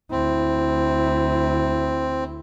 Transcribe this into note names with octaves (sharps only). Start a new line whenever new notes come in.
D2 C4 E4